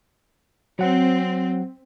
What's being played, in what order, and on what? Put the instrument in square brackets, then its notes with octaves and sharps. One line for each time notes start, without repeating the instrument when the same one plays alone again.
[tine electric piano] F#3 F#5 [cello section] C4